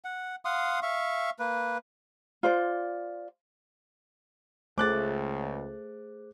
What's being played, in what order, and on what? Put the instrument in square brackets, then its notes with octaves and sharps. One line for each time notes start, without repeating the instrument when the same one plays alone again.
[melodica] F#5
F5 F#5 C6 D#6
E5 F5 C#6
A#3 B4
[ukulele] F4 C5 D5
[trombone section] C#2 [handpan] A3 [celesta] G#4 C5 [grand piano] D6 F#6 A6